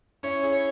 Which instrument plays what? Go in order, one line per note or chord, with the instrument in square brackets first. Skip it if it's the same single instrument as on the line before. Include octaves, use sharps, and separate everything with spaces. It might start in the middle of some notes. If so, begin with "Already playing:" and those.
[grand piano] C#4 E4 [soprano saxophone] C#5
[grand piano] E4 G#4
[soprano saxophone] C#5